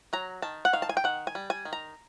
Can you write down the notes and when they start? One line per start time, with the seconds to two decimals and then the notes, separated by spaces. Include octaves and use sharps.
0.13 F#3 A#5
0.42 D#3 A5
0.65 F#5
0.73 D#3 F5
0.82 A5
0.89 G#5
0.97 G5
1.04 D#3 F#5
1.27 G#5
1.35 G3
1.50 G#5
1.65 D#3
1.73 A#5